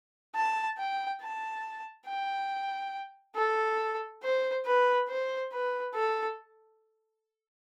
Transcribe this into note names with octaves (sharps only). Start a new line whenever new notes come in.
A5
G5
A5
G5
A4
C5
B4
C5
B4
A4